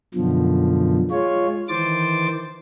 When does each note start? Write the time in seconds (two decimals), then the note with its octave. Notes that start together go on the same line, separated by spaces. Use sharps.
0.15 F#2 B2 D3 F3
1.11 G#3 F4 C#5
1.69 D#3 E3 C5 D6 A6